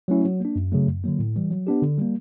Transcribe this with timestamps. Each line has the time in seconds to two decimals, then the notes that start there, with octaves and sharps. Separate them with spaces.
0.08 F#3 A3 C#4 E4
0.25 F#3
0.40 A#3 D4
0.56 F#2
0.72 C#3 F#3 A3
0.87 F#2
1.04 D3 F#3 A#3
1.19 A2
1.36 E3 G3
1.51 F#3
1.67 B3 D4 G4
1.82 D3
1.98 G3 A#3